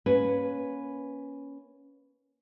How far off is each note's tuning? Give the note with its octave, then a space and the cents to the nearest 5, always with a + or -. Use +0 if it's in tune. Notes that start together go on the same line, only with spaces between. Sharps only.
A#3 +25 C#4 +0 B4 +0